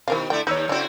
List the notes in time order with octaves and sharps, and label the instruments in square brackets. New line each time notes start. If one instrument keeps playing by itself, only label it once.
[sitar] B2 D#3 [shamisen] E4 A#4 F5
[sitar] D3 A3 E4 [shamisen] G5
[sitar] D#2 B4 [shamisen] D#4 [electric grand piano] C#5 E6 G6
[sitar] C#3 E4 F#4 [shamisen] F3 C4